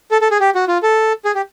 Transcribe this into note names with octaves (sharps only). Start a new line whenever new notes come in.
A4
A4
G#4
G4
F#4
F4
A4
G#4
G4